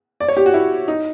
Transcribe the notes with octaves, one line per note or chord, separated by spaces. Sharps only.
D5
C#5
G4
F#4
E4
D#4